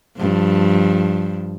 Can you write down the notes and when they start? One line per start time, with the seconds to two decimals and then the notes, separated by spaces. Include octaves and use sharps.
0.17 G2 F3